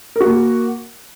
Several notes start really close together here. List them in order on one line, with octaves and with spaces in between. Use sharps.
A#4 F#4 A#3